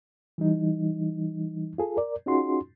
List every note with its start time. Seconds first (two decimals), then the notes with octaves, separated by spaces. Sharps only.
0.38 E3 G3 D#4
1.78 F4 G#4 A4
1.97 A#4 D5
2.26 C#4 D#4 F4 F#4 G#4 C6